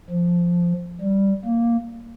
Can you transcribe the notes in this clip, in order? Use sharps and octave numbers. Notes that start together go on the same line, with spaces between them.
F3
G3
A#3